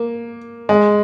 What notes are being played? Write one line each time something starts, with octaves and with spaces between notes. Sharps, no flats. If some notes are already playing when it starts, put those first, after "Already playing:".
Already playing: A#3
G#3